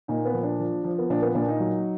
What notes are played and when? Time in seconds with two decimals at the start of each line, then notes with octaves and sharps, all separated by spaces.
0.08 A#2 D#4
0.25 B3
0.33 F3
0.43 D4
0.60 F3
0.84 F3
0.98 B3
1.10 A#2 D4
1.22 B3
1.35 A#2 D4
1.48 D#4
1.60 F#3